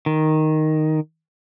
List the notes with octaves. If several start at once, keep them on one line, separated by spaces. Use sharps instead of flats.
D#3